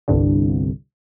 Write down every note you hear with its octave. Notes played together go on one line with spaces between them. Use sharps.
G1 C2 G2 D3